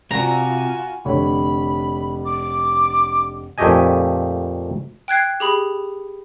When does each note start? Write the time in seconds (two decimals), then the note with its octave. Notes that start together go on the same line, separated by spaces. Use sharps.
0.11 C3 F4 F#4 G#5 A#5
1.05 F1 D3 C#5 B5
2.25 D6
3.58 F2 A#2 A3 G4 D#5 G#5
5.08 G5 F#6 G#6 C7
5.40 G4 G#4 B5